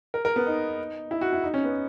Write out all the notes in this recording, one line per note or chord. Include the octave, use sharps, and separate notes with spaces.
A#4
A#4
B3
D#4
E4
F#4
E4
D#4
C#4
B3